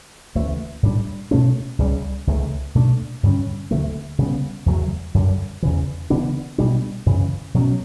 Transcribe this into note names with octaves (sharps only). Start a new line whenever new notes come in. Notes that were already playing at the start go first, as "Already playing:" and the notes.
D2 C#3 E3 A3
A2 G3 D4
B2 A3 C#4
C#2 C#3 G3
C#2 C#3 E3 A3
B2 A3 D4
G2 D3 G3 C#4
D2 D3 F#3 A3
C#3 G3 B3
E2 C#3 F#3 A3
F#2 D3 G3
E2 C#3 E3
C#3 E3 B3 D4
B2 G3 D4
F#2 C#3 E3
B2 F#3 C#4